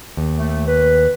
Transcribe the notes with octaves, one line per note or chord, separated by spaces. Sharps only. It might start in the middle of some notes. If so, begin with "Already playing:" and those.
D#2
A3
B4